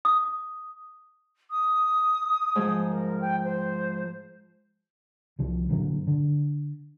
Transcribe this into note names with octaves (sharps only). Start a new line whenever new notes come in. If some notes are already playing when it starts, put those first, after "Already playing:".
D#6
D#6
G#2 F3
A#4
G5
C5
C2 F3
G2 A#2 D3 F#3
D3